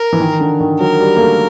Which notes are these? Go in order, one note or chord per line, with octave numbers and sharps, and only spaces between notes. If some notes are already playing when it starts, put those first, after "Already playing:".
Already playing: A#4
E3
D#3
D3
D#3
F#3 A#4
G3
A#3
A3